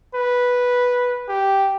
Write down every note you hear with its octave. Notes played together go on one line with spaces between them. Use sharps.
B4
G4